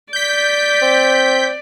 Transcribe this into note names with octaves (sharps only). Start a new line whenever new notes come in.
D5 G6 B6
C4